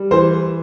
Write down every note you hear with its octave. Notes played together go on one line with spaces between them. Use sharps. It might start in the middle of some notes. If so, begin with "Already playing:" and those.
Already playing: G3
E3 C5